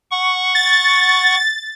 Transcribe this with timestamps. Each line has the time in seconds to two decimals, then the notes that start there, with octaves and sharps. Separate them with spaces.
0.11 F#5 C#6
0.55 A6